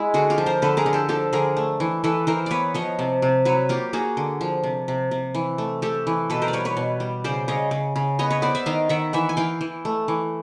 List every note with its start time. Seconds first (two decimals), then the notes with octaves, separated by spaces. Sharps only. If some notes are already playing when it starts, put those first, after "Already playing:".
Already playing: G#3 E4
0.14 D3 F#4 G#4
0.30 F4 G4
0.38 F3
0.46 A#4 C5
0.62 D3 A4 B4
0.77 G#4 A#4
0.86 D3
0.93 G4 A4
1.09 F3 G4 A4
1.33 D3 G#4 A#4
1.57 A3
1.80 E3
2.04 E3 A4 B4
2.27 E3 A#4 C5
2.46 B3 B4 C#5 D5
2.74 F3 C#5 D#5
2.99 C3
3.22 C3
3.45 F#3 B4 C#5
3.69 A#3 F4 G4
3.93 A#3 F#4 G#4
4.17 D3
4.41 F3
4.63 C3
4.88 C3
5.11 C3
5.35 E3
5.58 A3
5.82 A3 G4 A4
6.07 E3
6.30 B2 A4 B4
6.42 A#4 C5
6.48 D5
6.53 G3 B4 C#5
6.65 B4 C#5
6.77 B2
7.00 G3
7.24 C#3 C5 D5
7.48 C#3 C#5 D#5
7.71 C#3
7.96 C#3
8.19 B3 C#5 D#5
8.30 B4 C#5
8.42 B3 C5 D5
8.55 D5 E5
8.66 D#3 D#5 F5
8.89 D#3 E5 F#5
9.13 E3 E5 F#5
9.29 G#5
9.37 E3 F5 G5
9.61 E3
9.85 A3
10.08 E3